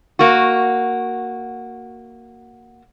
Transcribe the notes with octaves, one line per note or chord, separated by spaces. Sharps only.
A#3 F#4